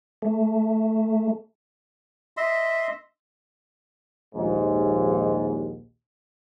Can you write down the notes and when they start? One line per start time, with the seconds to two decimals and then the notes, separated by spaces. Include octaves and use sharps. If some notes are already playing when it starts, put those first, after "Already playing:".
0.22 A3
2.37 D#5 E5 C6
4.35 A#1 D#2 G#2